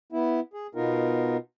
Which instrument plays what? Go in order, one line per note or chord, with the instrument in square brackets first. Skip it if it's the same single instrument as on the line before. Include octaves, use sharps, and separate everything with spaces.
[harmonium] B3 E4
G#4
B2 B3 D#4 F4 A#4